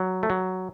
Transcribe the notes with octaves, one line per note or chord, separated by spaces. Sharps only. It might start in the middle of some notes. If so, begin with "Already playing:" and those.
Already playing: F#3
A3
F#3